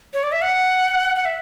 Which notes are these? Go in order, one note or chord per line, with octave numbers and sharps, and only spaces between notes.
C#5
D5
E5
F#5
F#5
E5